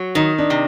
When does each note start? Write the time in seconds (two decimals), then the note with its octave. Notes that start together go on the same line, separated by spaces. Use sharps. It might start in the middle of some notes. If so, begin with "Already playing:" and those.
Already playing: F#3
0.15 D#3 D#4
0.38 D4
0.50 C3